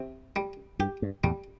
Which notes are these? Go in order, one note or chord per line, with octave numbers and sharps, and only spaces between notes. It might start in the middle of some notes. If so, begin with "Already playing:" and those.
Already playing: C3
G3
G2 G4
G2
E2 A2 G3